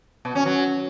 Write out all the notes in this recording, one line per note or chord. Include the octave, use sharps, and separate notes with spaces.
B2
C#4
F#3